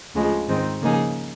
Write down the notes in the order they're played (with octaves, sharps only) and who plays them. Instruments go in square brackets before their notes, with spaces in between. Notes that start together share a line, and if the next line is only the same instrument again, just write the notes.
[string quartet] D2 C#3 F3 G#3
G#2 D#3 G#3 C4 D#4
C#3 F3 A#3 D#4 G#4